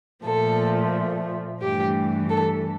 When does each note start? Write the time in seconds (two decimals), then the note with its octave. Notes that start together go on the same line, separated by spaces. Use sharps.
0.24 A#2 F3 A3 A4
1.62 G2 E3 A3 G4
2.29 A4